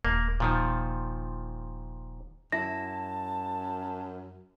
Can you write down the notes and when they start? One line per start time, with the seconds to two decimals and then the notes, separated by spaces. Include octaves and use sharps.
0.05 D#1 A#3
0.40 A#2 D#3 F3
2.52 F#2 E4 A5 A#6